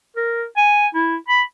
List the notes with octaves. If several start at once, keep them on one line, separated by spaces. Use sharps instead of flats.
A#4
G#5
E4
B5